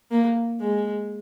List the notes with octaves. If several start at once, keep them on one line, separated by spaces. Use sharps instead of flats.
A#3
G#3